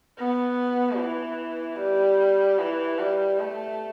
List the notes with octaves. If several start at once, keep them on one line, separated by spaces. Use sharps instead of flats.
B3
E3
G3
E3
G3
A3